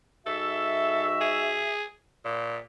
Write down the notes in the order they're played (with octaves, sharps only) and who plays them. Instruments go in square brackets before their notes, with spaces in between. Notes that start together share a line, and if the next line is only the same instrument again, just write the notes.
[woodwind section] G#2 F#4 E5 [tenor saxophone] A4
[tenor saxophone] G#4
A#2